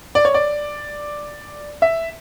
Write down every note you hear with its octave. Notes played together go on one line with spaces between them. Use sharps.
D5
C#5
D5
E5